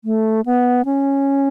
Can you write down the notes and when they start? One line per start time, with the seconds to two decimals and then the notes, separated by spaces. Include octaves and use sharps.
0.05 A3
0.46 B3
0.85 C#4